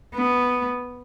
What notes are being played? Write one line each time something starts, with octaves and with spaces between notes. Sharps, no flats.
B3